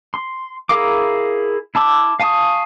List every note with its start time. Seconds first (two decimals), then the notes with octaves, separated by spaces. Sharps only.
0.14 C6
0.69 E4 G#4 A#4 F5 D6
1.75 E4 A5 D6 E6
2.20 F5 G#5 A5 C#6 D#6